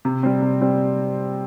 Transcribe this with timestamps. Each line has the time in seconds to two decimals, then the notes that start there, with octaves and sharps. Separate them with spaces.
0.05 C3
0.23 G3 C4
0.42 C3
0.61 G3 C4